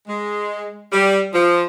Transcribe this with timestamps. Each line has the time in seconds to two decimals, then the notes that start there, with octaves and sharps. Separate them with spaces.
0.08 G#3
0.93 G3
1.34 F3